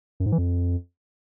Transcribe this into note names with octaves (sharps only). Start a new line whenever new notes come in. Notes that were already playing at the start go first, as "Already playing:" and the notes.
F#2
G#2
E3
F2